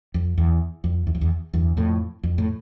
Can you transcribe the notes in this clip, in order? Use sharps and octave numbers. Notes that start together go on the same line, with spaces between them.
F2
E2
F2
E2
F2
E2
E2 G2
F2 A2
F2
A2